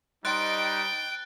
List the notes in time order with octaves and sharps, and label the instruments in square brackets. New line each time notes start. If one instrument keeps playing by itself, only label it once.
[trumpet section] G3 D#4 [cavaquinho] C5 D#5 [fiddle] G5 [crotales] F#6 A6 D7